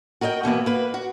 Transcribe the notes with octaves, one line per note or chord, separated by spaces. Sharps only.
F#4 A#4 D#5 F#5 G5
B2 E3 A#3 B3
A#3 B4
F#4